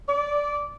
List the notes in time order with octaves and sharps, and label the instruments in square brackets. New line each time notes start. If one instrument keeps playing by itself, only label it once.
[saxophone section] D5